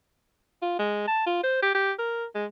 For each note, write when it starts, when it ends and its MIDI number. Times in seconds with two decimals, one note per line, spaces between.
0.62 0.76 65
0.79 1.05 56
1.07 1.23 81
1.26 1.41 65
1.43 1.59 72
1.62 1.72 67
1.75 1.92 67
1.99 2.25 70
2.35 2.46 56